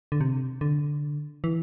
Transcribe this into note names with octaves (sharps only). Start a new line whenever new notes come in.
D3
C3
D3
E3